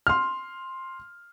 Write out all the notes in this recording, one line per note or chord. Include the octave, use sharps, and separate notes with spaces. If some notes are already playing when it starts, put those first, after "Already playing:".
C6 F6